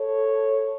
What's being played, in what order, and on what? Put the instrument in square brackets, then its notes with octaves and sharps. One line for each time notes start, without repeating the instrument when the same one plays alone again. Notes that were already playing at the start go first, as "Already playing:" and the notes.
Already playing: [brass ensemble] A4 C#5